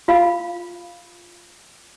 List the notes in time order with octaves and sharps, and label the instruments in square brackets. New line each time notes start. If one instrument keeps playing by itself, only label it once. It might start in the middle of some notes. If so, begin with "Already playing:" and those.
[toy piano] F4 F5 B5